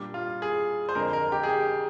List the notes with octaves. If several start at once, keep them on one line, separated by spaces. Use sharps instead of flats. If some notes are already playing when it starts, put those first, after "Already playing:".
Already playing: A#2 G3 D4
F4
G#4
C5
F2 D3 G#3 A#4
A#4
G4
G#4
G4